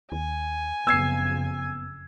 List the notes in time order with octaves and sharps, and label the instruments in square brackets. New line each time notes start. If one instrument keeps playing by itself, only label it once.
[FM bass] D#2 [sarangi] G#5
[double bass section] F#1 F2 C#3 [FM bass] B3 [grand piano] E6 G#6 C7